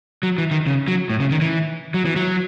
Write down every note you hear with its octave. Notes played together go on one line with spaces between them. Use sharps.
F#3
E3
D#3
C#3
F#3
A2
C#3
D#3
E3
F#3
E3
F#3